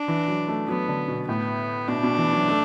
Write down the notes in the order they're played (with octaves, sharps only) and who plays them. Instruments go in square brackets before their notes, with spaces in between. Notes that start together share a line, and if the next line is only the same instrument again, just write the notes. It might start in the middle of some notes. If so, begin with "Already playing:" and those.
Already playing: [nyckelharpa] D4
[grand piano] E3
F#3
A3
[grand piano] F#3 [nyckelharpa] B3
[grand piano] D3
B2
[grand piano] A2 [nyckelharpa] B3
[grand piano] B2 [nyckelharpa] D4
[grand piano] B2
E3
F#3
A3